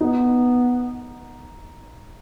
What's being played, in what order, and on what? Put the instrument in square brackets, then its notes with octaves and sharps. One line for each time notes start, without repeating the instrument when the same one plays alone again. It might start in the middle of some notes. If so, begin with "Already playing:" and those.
[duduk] B3 [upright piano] D#4